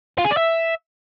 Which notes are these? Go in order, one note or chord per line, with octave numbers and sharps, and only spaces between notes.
F4
G#4
D5
E5